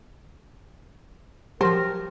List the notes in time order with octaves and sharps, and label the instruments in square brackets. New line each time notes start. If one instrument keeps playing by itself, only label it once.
[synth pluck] F3 F#3 [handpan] G4 [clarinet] A#4 [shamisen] C5